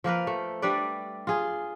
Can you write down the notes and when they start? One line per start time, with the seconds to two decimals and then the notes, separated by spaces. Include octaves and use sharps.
0.04 F3 A#3 A#4 B4
0.27 A3
0.62 G3 D4 B4 D5
1.27 F4 G#4